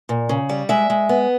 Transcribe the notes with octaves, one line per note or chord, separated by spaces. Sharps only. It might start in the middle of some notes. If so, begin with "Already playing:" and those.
A#2
C#3
G3
G#3 E5
G#3
B3